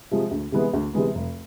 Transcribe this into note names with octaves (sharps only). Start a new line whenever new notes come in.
C3 F3 G#3
D2
C3 E3 G#3 B3
D2
C3 E3 G#3 B3
F1